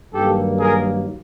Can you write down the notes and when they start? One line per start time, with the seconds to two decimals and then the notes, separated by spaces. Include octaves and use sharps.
0.13 G2 D#3 F#3 A#3 G4 A4
0.58 G#4 A#4